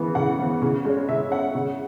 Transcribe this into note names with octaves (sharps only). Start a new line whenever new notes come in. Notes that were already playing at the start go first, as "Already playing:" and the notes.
Already playing: C#3 E3 B3
C#3 F#5
E3 B3
C#3
G#3 C#4
C#3 E5
G#3 C#4 F#5
C#3